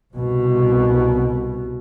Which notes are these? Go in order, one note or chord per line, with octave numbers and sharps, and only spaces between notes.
C2 B2